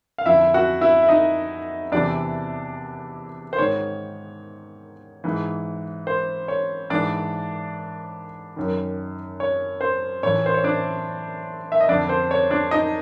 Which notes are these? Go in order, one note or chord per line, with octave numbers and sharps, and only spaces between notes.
F5
F2 D3 E4 E5
F#4 F#5
E4 E5
E5
D#4 D#5
E2 C3 E3 D4 D5
C5
G#2 D#3 C#5
G#2 E3
C5
C#5
G#2 E3 D4 D5
F#2 D#3
C#5
C5
A2 E3 C#5
C5
C#5
D4 D5
E5
D#5
F2 D3 D4 D5
C5
C#5
D4 D5
D#4 D#5